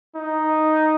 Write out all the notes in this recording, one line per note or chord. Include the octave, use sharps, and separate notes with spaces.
D#4